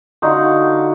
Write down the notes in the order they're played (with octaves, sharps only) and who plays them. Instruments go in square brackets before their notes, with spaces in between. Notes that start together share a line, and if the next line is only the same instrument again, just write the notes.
[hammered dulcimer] D3 D#4 F4 F#4